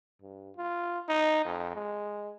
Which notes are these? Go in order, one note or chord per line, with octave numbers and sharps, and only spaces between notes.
G2
F4
D#4
F2
G#3